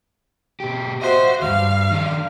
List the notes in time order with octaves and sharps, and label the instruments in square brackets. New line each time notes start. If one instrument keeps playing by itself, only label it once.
[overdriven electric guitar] B2 G4
[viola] F#4 C5 [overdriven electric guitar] D#5 E5
[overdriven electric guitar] D2 G2 [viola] F5
[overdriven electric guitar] D#3 D4